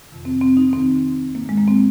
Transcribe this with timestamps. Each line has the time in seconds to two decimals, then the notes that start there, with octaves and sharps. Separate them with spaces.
0.10 F2 C3 D#3
0.25 C4
0.41 C4
0.57 D#4
0.73 D#2 D#3 C4
1.35 G#2 D#3 A#3
1.49 G#3
1.58 A#3
1.67 C4